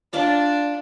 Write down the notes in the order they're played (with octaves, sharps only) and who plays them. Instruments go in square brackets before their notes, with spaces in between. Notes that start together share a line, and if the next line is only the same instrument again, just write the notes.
[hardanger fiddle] D4 [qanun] F4 D5 A5